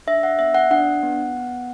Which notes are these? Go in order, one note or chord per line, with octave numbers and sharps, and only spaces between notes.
D4 E5
F#5
B3 E5
F#5
D4 F#5
B3
B3